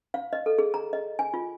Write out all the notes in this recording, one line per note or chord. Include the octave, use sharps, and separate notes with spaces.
F5
D#5
A4
G#4
A#5
D#5
G#5
F4